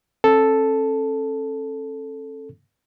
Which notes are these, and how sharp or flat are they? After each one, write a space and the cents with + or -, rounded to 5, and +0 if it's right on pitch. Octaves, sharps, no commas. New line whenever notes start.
C#4 -45 A4 +0